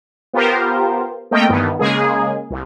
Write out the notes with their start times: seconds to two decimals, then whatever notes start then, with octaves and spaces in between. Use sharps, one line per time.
0.33 B3 F4 G4 A#4 C5
1.31 A3 A#3 C4 A#4 D#5 G5
1.49 G2 D#3 E3 B3
1.79 C#3 G#3 A#3 G#4
2.50 C2